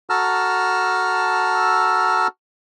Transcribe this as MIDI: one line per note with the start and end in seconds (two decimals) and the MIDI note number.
0.10 2.27 66
0.10 2.27 69
0.10 2.27 81
0.10 2.27 82
0.10 2.27 88
0.10 2.27 89